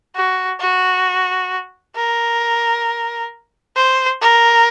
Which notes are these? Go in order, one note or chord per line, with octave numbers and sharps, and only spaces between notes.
F#4
F#4
A#4
C5
A#4